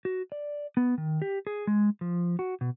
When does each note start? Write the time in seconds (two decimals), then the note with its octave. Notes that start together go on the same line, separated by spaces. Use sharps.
0.05 F#4
0.32 D5
0.77 B3
0.98 D#3
1.22 G4
1.47 G#4
1.67 G#3
2.01 F3
2.39 F#4
2.61 B2